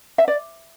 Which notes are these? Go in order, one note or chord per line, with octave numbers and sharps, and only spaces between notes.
E5
D5